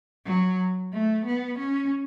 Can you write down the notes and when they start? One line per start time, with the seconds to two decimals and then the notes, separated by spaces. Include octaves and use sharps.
0.26 F#3
0.92 A3
1.25 B3
1.58 C#4